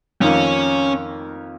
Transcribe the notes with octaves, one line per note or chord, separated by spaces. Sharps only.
F2 D#3 A#3 C#4